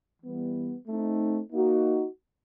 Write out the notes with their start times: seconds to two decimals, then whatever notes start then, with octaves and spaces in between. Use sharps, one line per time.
0.23 E3 G3 B3
0.88 A3 C4 D#4
1.53 A#3 D#4 F#4